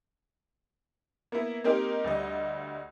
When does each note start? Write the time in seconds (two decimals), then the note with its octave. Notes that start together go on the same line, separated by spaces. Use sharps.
1.32 A#3 B3 E4
1.64 A#3 C4 D#4 G4 A#4
2.04 D2 G3 D#5